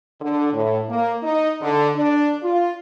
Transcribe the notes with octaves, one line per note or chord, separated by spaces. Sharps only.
D3
A2
A#3
D#4
D3
D4
F4